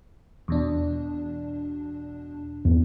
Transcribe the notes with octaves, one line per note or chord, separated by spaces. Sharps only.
E2 B2 D4
E2